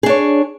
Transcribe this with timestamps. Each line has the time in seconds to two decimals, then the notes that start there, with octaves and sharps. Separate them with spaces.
0.03 G#4
0.06 D4
0.09 C#5